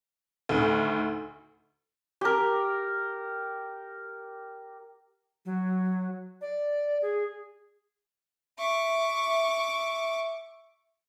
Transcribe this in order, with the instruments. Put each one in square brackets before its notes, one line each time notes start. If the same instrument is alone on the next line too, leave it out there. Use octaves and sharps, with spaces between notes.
[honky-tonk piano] D2 A2 D#3
[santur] G4 A#4
[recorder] F#3
D5
G#4
[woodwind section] E5 [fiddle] C#6 D6